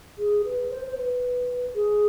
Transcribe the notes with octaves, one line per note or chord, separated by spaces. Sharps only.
G#4
B4
C5
C5
B4
G#4